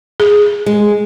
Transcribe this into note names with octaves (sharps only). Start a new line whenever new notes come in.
G#4
G#3